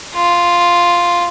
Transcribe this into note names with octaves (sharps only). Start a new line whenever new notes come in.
F4